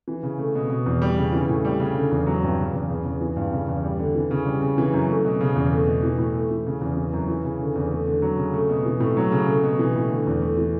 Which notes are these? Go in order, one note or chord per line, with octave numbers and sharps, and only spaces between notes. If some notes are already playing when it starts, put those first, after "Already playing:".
E3
C#3
A3
B2
B2
E2
G3
C#3
E3
A2
G3
C#3
D3
E2
F#3
G2
C#3
E2
C#3
E2
E3
G2
C#3
E2
G3
D3
E3
C#3
G3
C#3
E3
F#2
A3
B2
C#3
E2
A3
B2
E3
A2
A3
E3
C#3
E2
E3
F#2
E3
C#3
D3
E2
A3
D3
F#3
C#3
A3
B2
E3
A2
F#3
C#3
A3
B2
E3
A2
D3
E2
A3
E3